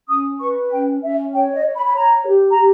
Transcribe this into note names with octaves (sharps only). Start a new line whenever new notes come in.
C#4 D#6
B4 C#6
C#4 G5
C#4 E5
C#5 G5
D#5
C#5
B5
B5
C#5 A#5
G4
A#5
G4